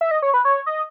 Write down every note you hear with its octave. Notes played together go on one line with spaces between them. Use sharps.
E5
D#5
C#5
B4
C#5
D#5